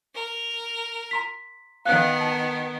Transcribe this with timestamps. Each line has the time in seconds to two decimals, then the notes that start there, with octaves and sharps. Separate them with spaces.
0.15 A#4
1.11 A#5 C6 B6
1.85 D#3 B3 F5 F#6
2.21 A5